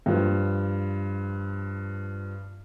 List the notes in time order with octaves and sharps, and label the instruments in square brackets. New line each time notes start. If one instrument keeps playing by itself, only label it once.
[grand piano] G2 F3